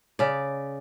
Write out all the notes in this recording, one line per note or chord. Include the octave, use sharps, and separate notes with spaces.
C#3 D5